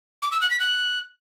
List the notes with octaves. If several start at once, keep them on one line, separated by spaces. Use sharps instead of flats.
D6
E6
F#6
B6
F#6